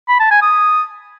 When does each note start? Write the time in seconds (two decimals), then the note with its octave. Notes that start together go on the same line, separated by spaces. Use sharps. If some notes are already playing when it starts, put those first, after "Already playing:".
0.08 B5
0.20 A5
0.31 G#5
0.42 D#6